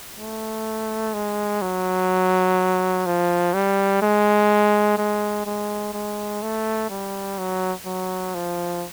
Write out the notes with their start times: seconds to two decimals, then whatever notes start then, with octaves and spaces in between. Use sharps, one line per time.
0.18 A3
1.14 G#3
1.62 F#3
3.06 F3
3.54 G3
4.02 G#3
4.98 G#3
5.46 G#3
5.94 G#3
6.43 A3
6.90 G3
7.39 F#3
7.86 F#3
8.35 F3